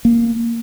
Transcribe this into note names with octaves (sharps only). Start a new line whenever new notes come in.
A#3